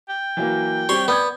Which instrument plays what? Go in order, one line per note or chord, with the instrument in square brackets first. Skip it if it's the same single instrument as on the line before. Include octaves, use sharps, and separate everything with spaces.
[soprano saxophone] G5
[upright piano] E3 F#3 A#3
[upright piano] G3 C4 G4 [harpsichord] C#5 C6
[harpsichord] B3 [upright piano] D5 G6 G#6